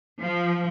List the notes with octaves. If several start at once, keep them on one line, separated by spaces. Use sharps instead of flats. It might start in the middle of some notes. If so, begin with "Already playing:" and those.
F3